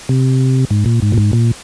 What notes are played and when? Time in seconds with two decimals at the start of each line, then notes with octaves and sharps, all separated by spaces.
0.09 C3
0.70 G#2
0.86 A#2
1.02 G#2
1.12 A#2
1.17 G#2
1.33 A#2